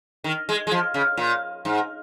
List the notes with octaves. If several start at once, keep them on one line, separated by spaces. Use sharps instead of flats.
D#3
G#3
G#3
F3
C#3
A#2
G#2